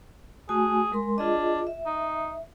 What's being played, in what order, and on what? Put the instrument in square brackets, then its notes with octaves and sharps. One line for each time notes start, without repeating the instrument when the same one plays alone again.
[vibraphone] A3 F#4 G#5 [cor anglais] G#4
[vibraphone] G#3 A#4 C6
[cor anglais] D4 [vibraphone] F4 G#4 D#5
[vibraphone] E5
[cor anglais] D#4